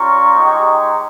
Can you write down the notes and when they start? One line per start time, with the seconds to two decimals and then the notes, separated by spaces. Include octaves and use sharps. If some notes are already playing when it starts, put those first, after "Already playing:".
Already playing: G3 C#4 F4 A#5 C#6
0.35 G#3 D#4 G4